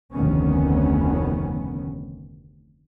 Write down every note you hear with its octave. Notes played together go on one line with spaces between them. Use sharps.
F1 D2 D#3 B3 C#4